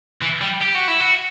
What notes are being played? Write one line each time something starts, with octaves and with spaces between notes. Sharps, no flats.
E3
G3
G4
F#4
E4
F#4